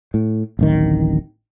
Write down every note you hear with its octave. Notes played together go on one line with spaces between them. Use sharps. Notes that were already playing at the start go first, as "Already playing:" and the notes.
A2
D1 A1 D#3